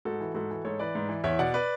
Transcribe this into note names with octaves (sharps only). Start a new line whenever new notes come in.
G#2 F#4 A4
E3
G#2 F#4 A4
E3
G#2 A4 C#5
E3 B4 D5
G#2
E3
E2 C#5 E5
B2 D5 F#5
B4 D5